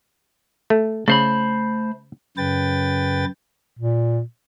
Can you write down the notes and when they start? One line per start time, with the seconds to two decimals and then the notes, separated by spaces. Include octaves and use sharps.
0.70 A3
1.08 C#3 A3 C5 B5
2.37 F#2 C#3 B4 G5 A6
3.79 A#2